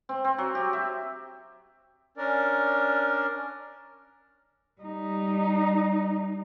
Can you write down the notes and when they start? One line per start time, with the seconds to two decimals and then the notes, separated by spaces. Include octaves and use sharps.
0.09 C4
0.24 C4
0.38 F#3
0.55 G4
0.73 E5
2.17 C#4 D4 A#4 D5
4.82 G3 D#4